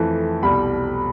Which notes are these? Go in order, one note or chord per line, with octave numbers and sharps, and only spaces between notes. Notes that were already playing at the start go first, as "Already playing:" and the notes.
Already playing: F2 E3 A3
C2 B2 G3 B5